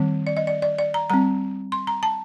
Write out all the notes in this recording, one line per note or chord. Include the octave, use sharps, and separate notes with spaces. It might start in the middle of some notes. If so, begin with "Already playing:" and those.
Already playing: D#3 G3 C4
D5
D#5
D5
D5
D5
A#5
G3 C4 A#5
C6
A#5
A5